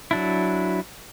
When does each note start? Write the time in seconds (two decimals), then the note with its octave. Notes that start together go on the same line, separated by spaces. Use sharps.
0.11 F#3 D4 E4